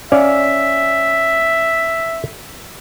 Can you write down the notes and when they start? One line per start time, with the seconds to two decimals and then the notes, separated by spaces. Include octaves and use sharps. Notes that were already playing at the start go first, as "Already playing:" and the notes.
0.12 C#4 D5 E5 F5